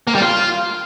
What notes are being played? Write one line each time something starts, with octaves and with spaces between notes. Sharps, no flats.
A#3
G3
F4